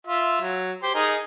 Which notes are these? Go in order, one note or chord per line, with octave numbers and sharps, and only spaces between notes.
F4 E5
F#3
G4 C5 C6
D#4 G#4 A#4